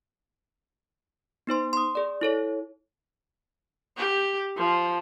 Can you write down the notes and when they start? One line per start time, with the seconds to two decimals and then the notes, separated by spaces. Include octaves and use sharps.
1.47 B3 D#4 C5 C6
1.73 C6 D#6
1.95 G#4 D5
2.21 E4 A4 C#5
3.97 G4
4.57 F3